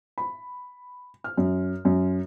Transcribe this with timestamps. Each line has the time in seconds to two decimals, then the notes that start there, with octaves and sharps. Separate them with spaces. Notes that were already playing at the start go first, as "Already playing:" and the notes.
0.18 B5
1.24 F6
1.37 F#2
1.85 F#2